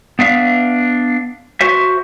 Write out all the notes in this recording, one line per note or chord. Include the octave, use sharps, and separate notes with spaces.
B3 D4 E5 F5
F#4 C5 E5